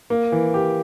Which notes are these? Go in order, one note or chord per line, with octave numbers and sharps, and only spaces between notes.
A#3
E3
G4